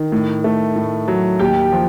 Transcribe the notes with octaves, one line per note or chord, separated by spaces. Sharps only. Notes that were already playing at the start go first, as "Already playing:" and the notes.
Already playing: D#3
A2
A3
A2
F#3
D#2 G4 G5
F3